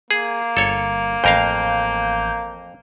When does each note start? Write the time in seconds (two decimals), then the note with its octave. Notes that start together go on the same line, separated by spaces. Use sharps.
0.11 A#3 G#4
0.57 G1 A4 C#5
1.24 A1 F2 A#4 F5 G6